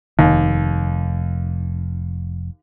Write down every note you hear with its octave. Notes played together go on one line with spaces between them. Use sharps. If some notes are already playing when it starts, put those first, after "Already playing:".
F1 D#2